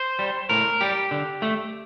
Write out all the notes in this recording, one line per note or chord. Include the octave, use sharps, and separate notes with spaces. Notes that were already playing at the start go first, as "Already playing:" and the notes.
Already playing: C5
G3
A2 A#4
G3 G4
D3
A3